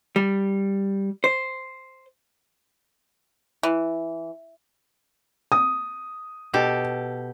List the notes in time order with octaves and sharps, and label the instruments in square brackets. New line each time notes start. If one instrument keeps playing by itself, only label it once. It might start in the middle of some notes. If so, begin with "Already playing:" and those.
[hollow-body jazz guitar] G3
C5
[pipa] E3
[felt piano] D#6
[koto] B2 G4 A4